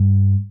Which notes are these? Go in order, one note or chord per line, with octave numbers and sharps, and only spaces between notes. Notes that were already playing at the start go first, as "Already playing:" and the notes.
Already playing: G2